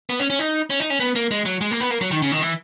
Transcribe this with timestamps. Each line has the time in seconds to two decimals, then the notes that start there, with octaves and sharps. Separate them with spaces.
0.09 B3
0.19 C#4
0.30 C#4
0.39 D#4
0.70 C#4
0.80 D#4
0.90 C#4
1.00 B3
1.16 A#3
1.31 G#3
1.46 F#3
1.61 G#3
1.71 A#3
1.80 B3
1.91 A#3
2.01 F#3
2.11 D#3
2.22 C#3
2.32 D#3
2.42 E3